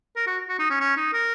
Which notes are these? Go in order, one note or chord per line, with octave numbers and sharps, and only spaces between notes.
A#4
F#4
F#4
D#4
C#4
C#4
D#4
A#4